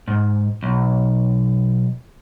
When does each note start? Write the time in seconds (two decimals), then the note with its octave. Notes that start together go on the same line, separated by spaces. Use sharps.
0.08 G#2
0.63 B1